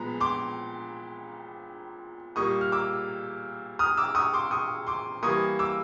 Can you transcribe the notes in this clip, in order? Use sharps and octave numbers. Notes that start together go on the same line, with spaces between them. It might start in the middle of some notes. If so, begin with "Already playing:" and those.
Already playing: A#2 F3 G#3 B3 A#5
C6 D6
A#2 G3 A#3 C#6 D#6
F6
D6 E6
D#6 F6
D6 E6
C#6 D#6
C6 D6
C#6 D#6
C6 D6
E3 G3 A#3 C#6 D#6
D6 E6